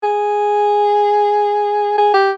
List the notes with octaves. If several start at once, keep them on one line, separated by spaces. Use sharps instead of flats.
G#4
G#4
G4